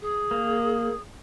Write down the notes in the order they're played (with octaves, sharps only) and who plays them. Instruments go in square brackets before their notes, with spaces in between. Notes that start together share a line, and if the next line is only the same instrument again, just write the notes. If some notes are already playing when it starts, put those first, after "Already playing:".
[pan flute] G#4
[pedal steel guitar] A#3